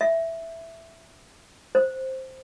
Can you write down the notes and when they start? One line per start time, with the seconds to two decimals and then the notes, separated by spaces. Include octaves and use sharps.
0.01 E5
1.75 C5